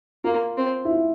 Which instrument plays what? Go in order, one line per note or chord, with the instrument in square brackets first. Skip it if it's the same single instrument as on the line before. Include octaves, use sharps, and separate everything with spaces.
[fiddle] A#3 [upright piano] F4
[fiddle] C4
[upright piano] E4
F4